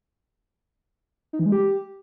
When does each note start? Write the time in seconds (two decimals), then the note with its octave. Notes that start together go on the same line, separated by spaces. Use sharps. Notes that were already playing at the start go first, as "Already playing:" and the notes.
1.33 D#4
1.39 E3
1.46 G#3
1.52 G4